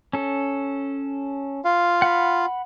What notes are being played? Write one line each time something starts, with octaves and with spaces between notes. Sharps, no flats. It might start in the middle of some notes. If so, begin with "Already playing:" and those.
C#4 A4
F4 F5
F#5 B5